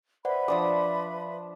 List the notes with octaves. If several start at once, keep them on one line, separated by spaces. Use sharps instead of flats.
B4 C5 D5 E5 F#5 B5
F3 D4 D6 D#6